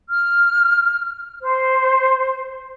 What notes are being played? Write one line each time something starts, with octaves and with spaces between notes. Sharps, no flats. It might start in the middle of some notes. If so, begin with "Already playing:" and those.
F6
C5